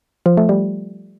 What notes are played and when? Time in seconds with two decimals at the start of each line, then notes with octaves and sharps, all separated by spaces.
0.26 F3
0.37 A3
0.49 G3